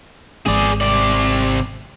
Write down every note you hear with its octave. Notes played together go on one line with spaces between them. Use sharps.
G#1 G#3 C4 G#4 D5
C3 D5